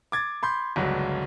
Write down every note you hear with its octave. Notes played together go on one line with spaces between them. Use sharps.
D6 G#6 A6
B5 C6 G6
G1 C#2 F#3